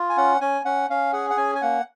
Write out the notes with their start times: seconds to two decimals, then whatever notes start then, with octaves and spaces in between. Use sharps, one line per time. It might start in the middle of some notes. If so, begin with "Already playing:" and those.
Already playing: F4
0.09 G#5
0.17 C#4 F#5
0.41 C#4 G#5
0.65 C#4 F#5
0.90 C#4 F5
1.13 G#4 F#5
1.30 F#5
1.37 C#4 G#5
1.55 G#5
1.62 A#3 F#5